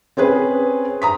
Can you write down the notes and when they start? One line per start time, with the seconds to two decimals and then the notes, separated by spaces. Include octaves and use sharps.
0.17 C4 C#4 G#4 B4
1.02 A#5 D#6 B6